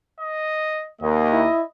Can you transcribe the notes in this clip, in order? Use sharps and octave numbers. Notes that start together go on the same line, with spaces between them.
D#5
D#2 A#3 D#5
E4